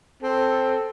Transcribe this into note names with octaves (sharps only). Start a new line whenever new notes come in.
C4 A4